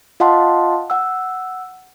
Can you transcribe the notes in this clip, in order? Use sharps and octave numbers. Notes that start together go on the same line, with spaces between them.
F4 D#5 F5 F#5 A5 C6
F#5 E6